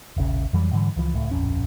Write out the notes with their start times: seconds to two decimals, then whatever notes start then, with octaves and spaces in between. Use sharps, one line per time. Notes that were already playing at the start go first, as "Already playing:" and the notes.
0.17 E1 A#1 C#3
0.53 F2 E3 F#3 G3
0.73 G#2 D3 E3 G3
0.96 C#2 E3 F3
1.15 D1 C#2 A2 A3
1.31 D1 A#1 F2 C#4